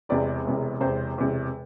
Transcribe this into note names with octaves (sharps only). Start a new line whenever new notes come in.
E1 E2 C3 D5
E1 E2 C3
E1 E2 C3 C5
E1 E2 C3